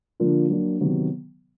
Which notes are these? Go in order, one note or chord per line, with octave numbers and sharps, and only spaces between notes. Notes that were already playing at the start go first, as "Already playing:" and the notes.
D3 F3 A#3 D4 F4
F#3 A#3 D4
C3 D#3 F#3 B3